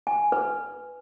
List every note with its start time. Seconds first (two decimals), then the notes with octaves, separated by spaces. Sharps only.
0.07 G#5
0.32 B4